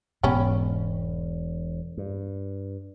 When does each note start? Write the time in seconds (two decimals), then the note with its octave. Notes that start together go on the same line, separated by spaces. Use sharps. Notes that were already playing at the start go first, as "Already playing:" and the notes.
0.23 E1 G#2 B2 B3 C#4 G4
1.97 G2